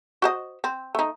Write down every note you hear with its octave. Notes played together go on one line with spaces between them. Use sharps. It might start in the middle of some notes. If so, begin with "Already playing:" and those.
F#4 C5 D#5
C4
A3 D#4